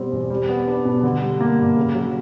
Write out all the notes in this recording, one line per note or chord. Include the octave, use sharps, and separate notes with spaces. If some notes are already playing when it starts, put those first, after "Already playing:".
Already playing: B2 G3 C4
E2
G3
B3
D4
B2
D3
G3
A#3
G2
C#3
F#3